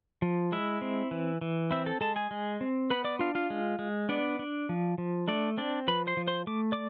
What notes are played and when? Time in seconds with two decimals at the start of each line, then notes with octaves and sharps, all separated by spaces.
0.22 F3
0.52 G#3 E4 E5
0.81 C4
1.11 E3
1.41 E3
1.71 C4 E4 E5
1.86 A4 A5
2.01 G#3 A4 A5
2.16 G#4 G#5
2.31 G#3
2.61 C4
2.90 B3 B4 B5
3.04 D5 D6
3.19 D4 F4 F5
3.35 F4 F5
3.50 G#3
3.79 G#3
4.09 B3 D4 D5
4.39 D4
4.69 F3
4.98 F3
5.28 A3 D4 D5
5.57 C4 D4 D5
5.88 F3 B4 B5
6.07 C5 C6
6.17 F3
6.27 C5 C6
6.47 A3 D6
6.72 D5 D6